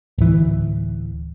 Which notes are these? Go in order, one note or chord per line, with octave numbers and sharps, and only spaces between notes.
D1 E3